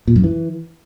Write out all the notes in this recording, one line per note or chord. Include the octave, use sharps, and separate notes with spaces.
A#2
F#2
E3